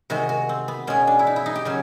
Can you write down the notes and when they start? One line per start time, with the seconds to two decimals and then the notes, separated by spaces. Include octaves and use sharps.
0.10 C3 D#3 G#3 F#4
0.29 F#4
0.49 C4
0.68 B3
0.87 B2 G#3 C#4
1.07 D4
1.19 E4
1.27 D#4
1.36 E4
1.46 D#4
1.55 G4
1.65 C#3 F#3 C#4